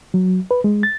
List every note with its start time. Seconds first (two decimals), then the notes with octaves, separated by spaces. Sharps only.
0.14 F#3
0.51 B4
0.64 G#3
0.83 A6